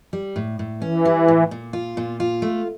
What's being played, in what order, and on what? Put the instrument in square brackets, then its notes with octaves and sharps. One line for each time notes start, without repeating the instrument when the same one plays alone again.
[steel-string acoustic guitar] G3
A2
A2
[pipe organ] E3 [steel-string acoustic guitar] C#4
[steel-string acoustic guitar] G3
A2
A#2
F4
A#2
F4
A3